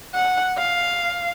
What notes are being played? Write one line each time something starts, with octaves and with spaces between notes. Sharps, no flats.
F#5
F5